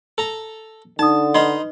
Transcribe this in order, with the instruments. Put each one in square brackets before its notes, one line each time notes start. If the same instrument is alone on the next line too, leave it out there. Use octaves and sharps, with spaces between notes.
[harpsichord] A4 A#5
[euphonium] D3 [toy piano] D#4 D#6 [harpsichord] A5
[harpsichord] D#4 B5 C6 [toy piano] B4 D#5